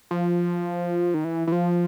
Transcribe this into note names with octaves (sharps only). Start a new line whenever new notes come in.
F3
D#3
E3
E3
F3